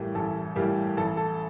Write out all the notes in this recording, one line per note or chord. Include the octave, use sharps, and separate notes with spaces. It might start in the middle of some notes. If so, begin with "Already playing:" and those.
Already playing: A1 A2 G3 A#3 G4
A1 A4
A2 G3 A#3 G4
A1 A4
A4